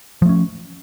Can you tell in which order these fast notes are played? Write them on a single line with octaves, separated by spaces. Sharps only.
F3 A3 C#4